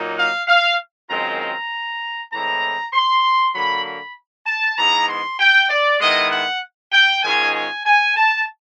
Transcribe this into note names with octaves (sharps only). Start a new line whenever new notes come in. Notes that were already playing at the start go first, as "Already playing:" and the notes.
Already playing: A#2 F#3 A#3 D#4
F5
F5
F#2 D#3 G#3 C4 F4 A#5
A#5
A2 E3 G#3 C4 A#5
C6
D3 F#3 A#3 B5
B5
A5
G#2 E3 G#3 B3 A#5
C6
G5
D5
D#3 G#3 B3 E4 D#5
F#5
G5
G#2 D#3 G#3 C#4 F4 G#5
G#5
G#5
A5